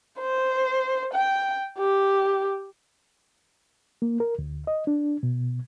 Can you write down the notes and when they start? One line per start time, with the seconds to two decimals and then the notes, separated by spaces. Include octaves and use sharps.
0.19 C5
1.13 G5
1.78 G4
4.02 A#3
4.20 A#4
4.39 D2
4.67 D#5
4.87 D4
5.23 B2